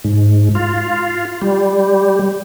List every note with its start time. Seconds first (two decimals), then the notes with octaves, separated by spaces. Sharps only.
0.04 G#2
0.55 F4
1.42 G3